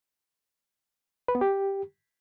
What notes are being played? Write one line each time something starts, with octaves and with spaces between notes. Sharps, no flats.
B4
B3
G4